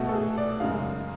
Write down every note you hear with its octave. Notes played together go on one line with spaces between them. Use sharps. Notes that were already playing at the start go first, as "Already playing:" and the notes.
Already playing: B2 A3 F#4
A4
G#4
D5
F#2 C#3 G#3 F5